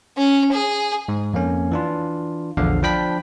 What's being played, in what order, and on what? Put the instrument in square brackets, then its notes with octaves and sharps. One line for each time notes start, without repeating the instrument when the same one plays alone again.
[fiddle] C#4
G#4
[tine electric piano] G#2
F2 A#3 C#4
E3 D4 F4
A#1 E2 D3 F3 F5
F3 D4 G5 B5 B6